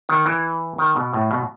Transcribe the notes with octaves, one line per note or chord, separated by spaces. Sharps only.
D#3
E3
D#3
B2
A2
B2